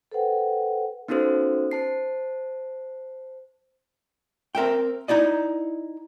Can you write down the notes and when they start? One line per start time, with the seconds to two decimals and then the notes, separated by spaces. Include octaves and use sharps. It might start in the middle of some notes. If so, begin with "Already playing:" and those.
0.12 A4 B4 C5 F#5 G5
1.08 B3 C#4 D#4 F#4 A4 C5
1.71 C5 A5 C7
4.55 C4 A#4 E5 G5
5.08 D#4 E4 D5 D#5